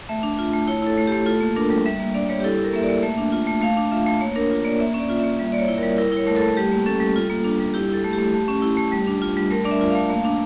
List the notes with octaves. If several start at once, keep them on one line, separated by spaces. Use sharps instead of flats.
A3 E5
D4
F4
A3
E4 C#5
E4 A4
A3
A3 G4
F4 A4
A#3
D4 A#4
G3
G3 E5
A#3 E5
D4 D5
G3 C#5
G4
E4 A4
E4
A#4
A#3 E5
D5
A#3
A3 E5
D4
F4
A3
A3 F5
D4
F4 E5
A3
A#3 C#5
D4 A#4
F4
A#3 D5
A#3 E5
C#4
D5
F4
A#3 E5
G3 E5
A#3 D5
C#5
E4
G3 A#4
E4 A#4
E4 C#5
A3 A#4
A4
A3
G3 G4
A#3
C#4 A4
G3
F4
A#3
D4
G3
E4 G4
E4 A4
A3
G4
A3
A3
C#4
E4
A3
G3
D4
F4
G3
A3 A#4
D4 D5
E5
F4 E5
A3 F5
A#3
D4